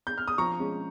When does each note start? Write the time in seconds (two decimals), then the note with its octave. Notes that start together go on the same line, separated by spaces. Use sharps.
0.07 G6
0.18 F6
0.28 D#6
0.38 F3 A#5 C#6
0.59 G#3 C#4